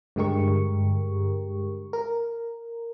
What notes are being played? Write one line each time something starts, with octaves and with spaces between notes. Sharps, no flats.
G2 D3 G#3 G4 A#4 C#6
A#4